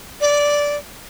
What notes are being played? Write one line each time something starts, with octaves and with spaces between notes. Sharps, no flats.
D5